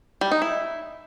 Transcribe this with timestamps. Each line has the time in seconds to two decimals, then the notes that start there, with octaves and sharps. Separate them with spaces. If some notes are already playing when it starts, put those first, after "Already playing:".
0.21 G3
0.31 D#4
0.42 E4